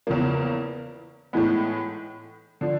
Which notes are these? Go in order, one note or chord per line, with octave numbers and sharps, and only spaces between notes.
E2 C#3 F3 A#3
A2 E3 G#3 B3
D3 F3